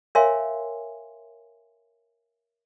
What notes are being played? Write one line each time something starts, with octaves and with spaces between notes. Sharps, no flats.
A#4 C#5 E5 F5 G#5 C6